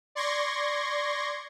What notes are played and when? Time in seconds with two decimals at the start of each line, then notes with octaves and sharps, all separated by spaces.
0.15 D5 C6 C#6 G#6 A#6